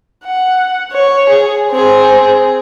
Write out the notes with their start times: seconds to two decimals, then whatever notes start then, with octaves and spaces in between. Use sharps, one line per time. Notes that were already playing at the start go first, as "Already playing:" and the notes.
0.25 F#5
0.93 C#5
1.30 G#4
1.71 C4 G#4